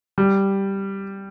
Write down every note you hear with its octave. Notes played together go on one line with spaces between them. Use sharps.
G3